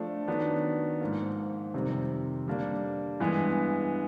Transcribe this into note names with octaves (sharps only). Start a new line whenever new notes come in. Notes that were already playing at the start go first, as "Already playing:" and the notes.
Already playing: F3 A3 D4
D#3 F#3 B3 D4
G#2 F3 A#3
F2 C3 D#3 G3 C4
D3 G3 A#3 D4
G2 E3 G#3 B3